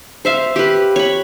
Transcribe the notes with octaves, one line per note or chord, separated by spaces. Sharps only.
C5 E5 F5
G4 B4
C#5 B5